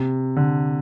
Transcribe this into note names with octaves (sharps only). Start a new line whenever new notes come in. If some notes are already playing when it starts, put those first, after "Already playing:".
Already playing: C3
D3